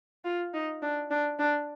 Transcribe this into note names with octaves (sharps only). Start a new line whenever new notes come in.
F4
D#4
D4
D4
D4